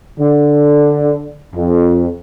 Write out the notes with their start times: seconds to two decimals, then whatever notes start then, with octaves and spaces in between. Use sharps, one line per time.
0.19 D3
1.55 F2